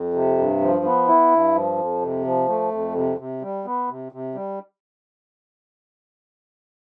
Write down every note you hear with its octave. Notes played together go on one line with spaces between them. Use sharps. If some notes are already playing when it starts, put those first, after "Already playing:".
Already playing: F2
C3
G2
F3
B3
E4
G2
F3
F2
C3
F3
A3
F2
C3
C3
G3
B3
C3
C3
G3